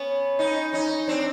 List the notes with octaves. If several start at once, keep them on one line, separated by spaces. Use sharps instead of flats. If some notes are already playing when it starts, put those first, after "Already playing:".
Already playing: B3 C#4
C#4 D#4
C#4 D#4
C4 D4